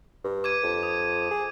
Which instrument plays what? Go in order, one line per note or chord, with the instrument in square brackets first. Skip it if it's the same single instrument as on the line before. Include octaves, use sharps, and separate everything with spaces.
[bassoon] G2
[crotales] D6 G#6 D#7
[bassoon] F2
[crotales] D#6
[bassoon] G#4